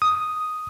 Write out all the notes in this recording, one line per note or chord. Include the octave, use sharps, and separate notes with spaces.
D#6